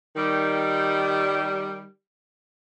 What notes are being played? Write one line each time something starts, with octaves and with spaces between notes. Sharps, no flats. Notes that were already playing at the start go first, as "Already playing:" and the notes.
D#3 G3